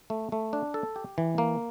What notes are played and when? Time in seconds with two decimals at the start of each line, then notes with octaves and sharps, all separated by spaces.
0.10 A3
0.32 A3
0.53 D4
0.74 A4
0.96 G4
1.18 E3
1.38 A#3